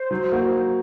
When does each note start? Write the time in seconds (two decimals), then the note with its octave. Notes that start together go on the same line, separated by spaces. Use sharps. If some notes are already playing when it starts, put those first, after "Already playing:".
Already playing: C5
0.11 F#3
0.32 A#3 F#4